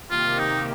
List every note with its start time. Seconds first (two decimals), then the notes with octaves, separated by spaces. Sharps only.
0.10 C3 D#3 A#3 F4 G4
0.39 D#4